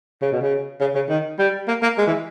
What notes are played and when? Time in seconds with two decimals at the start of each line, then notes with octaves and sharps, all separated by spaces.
0.22 C#3
0.32 B2
0.42 C#3
0.81 C#3
0.95 C#3
1.09 D#3
1.39 G3
1.68 A#3
1.83 A#3
1.98 G#3
2.07 E3